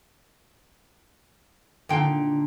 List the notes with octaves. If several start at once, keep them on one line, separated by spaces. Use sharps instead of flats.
A#2 D3 D#4 G5